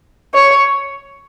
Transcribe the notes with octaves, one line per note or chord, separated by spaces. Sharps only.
C#5